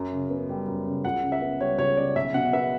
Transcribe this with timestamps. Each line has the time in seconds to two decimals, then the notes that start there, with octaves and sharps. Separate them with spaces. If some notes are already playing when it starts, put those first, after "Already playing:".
Already playing: F#2
0.12 C#3
0.30 B3
0.49 G3
0.68 F#2
0.87 C#3
1.05 C#2 F#5
1.23 C#3
1.32 E5
1.42 B3
1.60 G3 C#5
1.78 C#2 C#5
1.97 C#3 D5
2.15 B1 E5
2.34 B2 F#5
2.53 B3 E5